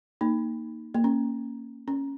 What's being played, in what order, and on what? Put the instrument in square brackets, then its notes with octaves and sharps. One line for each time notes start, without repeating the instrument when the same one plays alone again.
[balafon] A#3 D#4
A#3
C#4
C#4